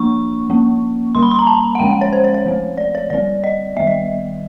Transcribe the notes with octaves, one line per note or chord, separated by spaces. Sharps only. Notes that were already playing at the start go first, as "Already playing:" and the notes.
Already playing: F3 A#3 D4 C#6
F3 A#3 C#4
D3 G3 A#3 C6
B5
C6
A#5
A5
F#5
D3 F3 G#3 C#4 G5
F#5
C#5
C5
C#5
C#5
F3 A3 C4
D5
C#5
D3 G3 C4 D5
D#5
D#3 G3 B3 E5
D#5